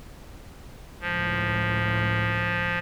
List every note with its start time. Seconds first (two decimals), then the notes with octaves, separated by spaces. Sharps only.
1.01 C#2 A2 F3